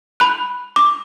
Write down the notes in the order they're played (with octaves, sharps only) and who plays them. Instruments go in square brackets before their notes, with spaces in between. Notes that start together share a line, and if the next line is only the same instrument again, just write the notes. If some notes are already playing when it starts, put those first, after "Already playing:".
[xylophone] B5 F#6
D6